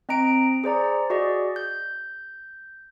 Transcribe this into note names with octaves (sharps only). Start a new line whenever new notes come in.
C4 D#5 A#5 D7
G#4 C5 D5 A#5
F#4 G#4 D5 D#5
G6